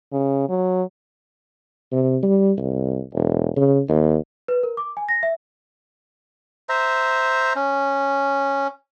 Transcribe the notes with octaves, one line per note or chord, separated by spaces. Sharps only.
C#3
F#3
C3
G3
C2
E1
C#3
D#2
B4
A#4
D6
G#5
A#6
E5
C5 E5 A#5
C#4